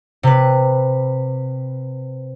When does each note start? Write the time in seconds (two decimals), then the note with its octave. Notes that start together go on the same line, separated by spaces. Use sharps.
0.23 C3 B4